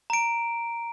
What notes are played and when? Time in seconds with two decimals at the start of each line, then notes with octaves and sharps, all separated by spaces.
0.10 A#5 D7